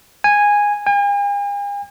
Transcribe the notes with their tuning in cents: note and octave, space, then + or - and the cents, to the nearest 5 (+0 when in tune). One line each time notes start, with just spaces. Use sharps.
G#5 -10
G#5 -45